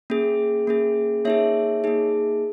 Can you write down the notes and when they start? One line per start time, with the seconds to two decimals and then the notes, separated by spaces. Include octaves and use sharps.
0.10 A#3 C#4 G#4
0.67 A#3 C#4 G#4
1.25 A#3 D#4 G#4 C#5 E5
1.84 A#3 D#4 G#4